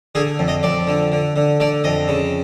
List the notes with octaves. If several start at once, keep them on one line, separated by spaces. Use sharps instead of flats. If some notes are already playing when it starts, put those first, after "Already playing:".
D3 G#4
F2
D#5
F2 D5
D3
D3
D3
D3 D5
F2 D#5
C#3